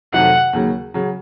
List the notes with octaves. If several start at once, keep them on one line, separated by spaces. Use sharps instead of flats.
F2 C3 D#3 F#3 A3 F#5
D#2 C#3 F#3
C#3 F#3